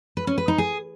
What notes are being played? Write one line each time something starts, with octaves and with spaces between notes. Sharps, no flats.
B4
C#4
B4
D#4
G#4